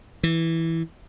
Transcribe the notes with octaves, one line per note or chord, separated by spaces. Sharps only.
E3